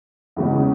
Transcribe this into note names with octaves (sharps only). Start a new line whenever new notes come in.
E2 C#3 E3 G#3 C#4